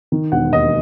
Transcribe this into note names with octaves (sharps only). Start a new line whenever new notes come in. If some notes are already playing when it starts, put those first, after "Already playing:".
D#3
E1 F#5
D#2 D#5